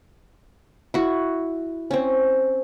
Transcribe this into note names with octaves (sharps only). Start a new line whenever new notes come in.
E4 F#4
C4 C#4